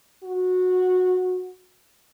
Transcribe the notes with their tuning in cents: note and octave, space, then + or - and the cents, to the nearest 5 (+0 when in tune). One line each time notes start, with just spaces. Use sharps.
F#4 -15